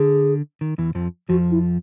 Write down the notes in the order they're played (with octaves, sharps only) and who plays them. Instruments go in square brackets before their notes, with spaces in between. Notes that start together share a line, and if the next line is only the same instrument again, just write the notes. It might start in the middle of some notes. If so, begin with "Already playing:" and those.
Already playing: [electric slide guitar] D3 [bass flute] G#4
[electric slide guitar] D#3
E2 E3
F2 F3
[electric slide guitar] F2 F3 [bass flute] F#4
[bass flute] E4